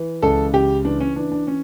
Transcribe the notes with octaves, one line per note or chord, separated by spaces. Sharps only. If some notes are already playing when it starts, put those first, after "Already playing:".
Already playing: E3
C#2 A4
C#3 G4
E3 D4
C#4
E3 D4
D4
C#4